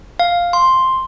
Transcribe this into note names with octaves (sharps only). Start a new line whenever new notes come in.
F5
C6